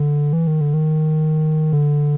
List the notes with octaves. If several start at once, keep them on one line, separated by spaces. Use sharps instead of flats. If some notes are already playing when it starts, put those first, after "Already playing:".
Already playing: D3
E3
D#3
D3
D#3
D3